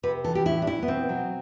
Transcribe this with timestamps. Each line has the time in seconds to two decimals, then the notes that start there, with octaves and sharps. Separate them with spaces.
0.03 C3 B4
0.24 E3 A4
0.35 G4
0.45 A2 E4
0.62 D4
0.67 E3 E4
0.82 B3
0.88 B2 C4
1.09 F#3